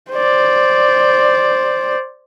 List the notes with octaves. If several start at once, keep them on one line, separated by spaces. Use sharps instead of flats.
C5 D5